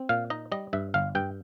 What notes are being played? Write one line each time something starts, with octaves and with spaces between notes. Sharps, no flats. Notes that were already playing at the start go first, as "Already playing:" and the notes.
Already playing: C4
A#2 F5
D#4 D#5
G3 D#5
G2 E5
G1 F5
G2 G5